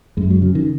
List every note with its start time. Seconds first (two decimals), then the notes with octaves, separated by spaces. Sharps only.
0.17 F#2 G#3
0.31 F#3
0.42 C#3 F#3
0.55 D#3